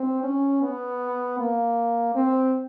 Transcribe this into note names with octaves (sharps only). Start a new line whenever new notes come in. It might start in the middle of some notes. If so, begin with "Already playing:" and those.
Already playing: C4
C#4
B3
A#3
C4